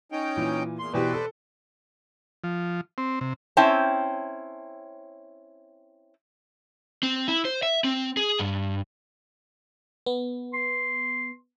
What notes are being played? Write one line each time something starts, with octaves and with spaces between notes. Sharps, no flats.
C#4 D#4 G5
A#2 E3
E2 A#2 C6
B2 E3 G4 B4 C5 D5
A4
F3
C4
C3
C4 C#4 E4 G5 A5
C4
E4
C5
E5
C4
G#4
G2
B3
C6